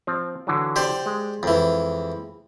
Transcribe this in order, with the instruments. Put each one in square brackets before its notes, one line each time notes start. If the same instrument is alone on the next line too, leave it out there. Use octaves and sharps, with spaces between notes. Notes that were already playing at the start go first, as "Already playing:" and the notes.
[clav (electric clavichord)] F3 C4
D3 E3 F#3
[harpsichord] G4 C5 D5
[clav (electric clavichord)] G#3
[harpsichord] F2 E3